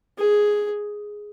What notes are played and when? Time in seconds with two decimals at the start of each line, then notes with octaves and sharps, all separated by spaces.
0.19 G#4